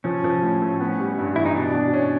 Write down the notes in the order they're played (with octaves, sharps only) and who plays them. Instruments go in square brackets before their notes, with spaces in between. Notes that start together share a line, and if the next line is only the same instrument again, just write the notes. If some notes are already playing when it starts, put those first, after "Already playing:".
[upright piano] F3 [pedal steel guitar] C#4
[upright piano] F3
A2
A2
B3
G3
G2
[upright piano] E3 [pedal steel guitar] E4
[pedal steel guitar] D#4
[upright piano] B2 [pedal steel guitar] D4
[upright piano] B2
C#4